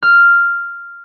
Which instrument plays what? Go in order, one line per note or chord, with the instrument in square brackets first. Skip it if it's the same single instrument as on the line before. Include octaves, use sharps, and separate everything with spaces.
[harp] F6